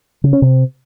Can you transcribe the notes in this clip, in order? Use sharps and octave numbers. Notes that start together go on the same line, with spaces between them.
C#3
C#4
C3